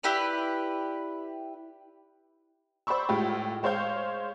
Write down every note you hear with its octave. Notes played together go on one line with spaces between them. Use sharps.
E4 G4 B4 D5
C5 D5 B5 C#6 E6
A2 G#3 F4 G4
G#3 C5 C#5 F5 G6